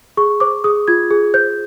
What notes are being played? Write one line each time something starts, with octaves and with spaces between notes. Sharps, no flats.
G#4 C#6
C5 D6
G#4 D#6
F4 G#6
G#4
C5 G6